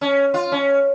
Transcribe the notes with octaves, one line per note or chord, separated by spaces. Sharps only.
C#4
F4
C#4